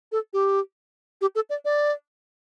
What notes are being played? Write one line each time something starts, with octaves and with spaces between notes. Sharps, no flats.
A4
G4
G4
A4
D5
D5